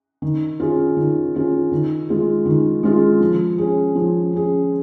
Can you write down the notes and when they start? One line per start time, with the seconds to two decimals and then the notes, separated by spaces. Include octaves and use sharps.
0.22 D#3
0.60 C#4 F4 G#4
0.97 D#3
1.35 C#4 F4 G#4
1.72 D#3
2.09 G#3 F4 G#4
2.46 D#3
2.83 G#3 F4 G#4
3.20 F3
3.58 C#4 G#4
3.95 F3
4.33 C#4 G#4